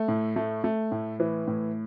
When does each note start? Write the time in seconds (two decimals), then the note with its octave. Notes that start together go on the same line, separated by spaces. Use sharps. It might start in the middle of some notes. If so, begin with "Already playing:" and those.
Already playing: A3
0.08 A2
0.36 A3
0.64 A3
0.92 A2
1.20 E3
1.48 A2